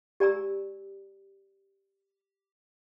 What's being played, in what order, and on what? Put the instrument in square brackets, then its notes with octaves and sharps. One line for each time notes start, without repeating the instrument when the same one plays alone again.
[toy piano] G4 D5 G#5 A#5 E6